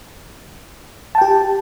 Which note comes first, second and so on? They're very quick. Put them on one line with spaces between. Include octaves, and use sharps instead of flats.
A5 G5 G4